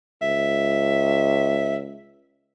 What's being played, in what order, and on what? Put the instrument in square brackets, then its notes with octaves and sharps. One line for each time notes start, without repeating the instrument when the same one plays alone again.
[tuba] C#2 [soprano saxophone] E5